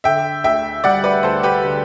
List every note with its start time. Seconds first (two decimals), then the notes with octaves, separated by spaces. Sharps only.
0.04 D3 E5 G5
0.44 D2 E5 G5
0.84 G3 D5 F#5
1.04 B4 D5
1.23 D2 A4 C5
1.43 G4 B4
1.64 D3